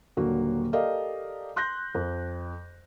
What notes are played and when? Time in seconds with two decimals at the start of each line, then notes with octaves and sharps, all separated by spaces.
0.17 D#1 D3 F#3 A#3 F#4
0.73 G4 A4 A#4 D5 D#5 F5
1.56 C6 F#6 G6 A#6
1.95 F2